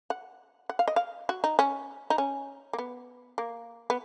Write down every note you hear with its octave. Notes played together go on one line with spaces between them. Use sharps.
F#5
F#5
F5
D#5
F5
F#4
D#4
C#4
D#4
C#4
A#3
B3
A#3
B3